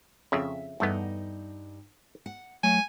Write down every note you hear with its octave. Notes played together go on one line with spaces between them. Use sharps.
F2 C#3 E5
E2 G2 A3 B3 D#4
F#5
F#3 A3 G#5